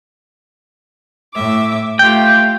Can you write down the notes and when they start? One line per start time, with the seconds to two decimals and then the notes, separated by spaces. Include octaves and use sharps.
1.34 A2 E5 D6
1.99 A3 F4 G4 G5